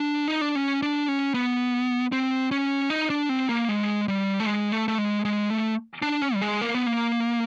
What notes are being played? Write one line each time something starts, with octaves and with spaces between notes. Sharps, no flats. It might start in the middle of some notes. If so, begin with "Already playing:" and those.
Already playing: D4
D#4
D4
C#4
D4
C#4
B3
C4
C#4
D#4
D4
C4
A#3
G#3
G3
A3
G#3
A3
A3
G#3
G#3
A3
D4
C#4
G3
G#3
A#3
B3
A#3